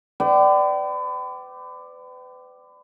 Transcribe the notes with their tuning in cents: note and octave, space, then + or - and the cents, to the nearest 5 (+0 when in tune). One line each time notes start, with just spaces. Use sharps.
B4 +40 D5 +5 G5 -35